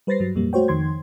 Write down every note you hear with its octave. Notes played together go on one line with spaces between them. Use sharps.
G3 B4 C5 A6 A#6 C7
G2 F#3
F2 A#2 G3 A#3
A3 F#4 C5 C#5 G5
F2 D#3 C6 G#6